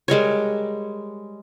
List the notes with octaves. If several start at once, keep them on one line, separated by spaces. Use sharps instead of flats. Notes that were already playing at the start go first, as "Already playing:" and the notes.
G3 G#3 A#4 C#5